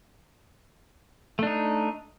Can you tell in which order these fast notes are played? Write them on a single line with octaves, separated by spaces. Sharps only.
A3 D4 D#4